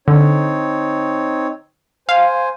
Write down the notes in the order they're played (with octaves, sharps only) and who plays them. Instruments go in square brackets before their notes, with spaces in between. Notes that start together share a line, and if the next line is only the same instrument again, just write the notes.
[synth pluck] D3 [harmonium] C4 D#4 C#5
[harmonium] C5 G#5 [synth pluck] F5